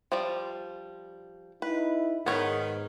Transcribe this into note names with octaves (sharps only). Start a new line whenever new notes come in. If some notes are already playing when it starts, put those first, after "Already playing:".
F3 G3 D5
D#4 E4 B4
G#2 D#3 B3 C#5